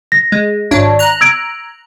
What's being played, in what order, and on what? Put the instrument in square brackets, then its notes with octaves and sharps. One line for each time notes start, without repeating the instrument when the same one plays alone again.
[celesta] A#6
[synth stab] G#3
G#1 D4 C#5
A#5 F#6
[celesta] E6 G#6 D7